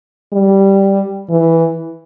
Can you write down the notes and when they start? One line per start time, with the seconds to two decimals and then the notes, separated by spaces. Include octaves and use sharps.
0.33 G3
1.30 E3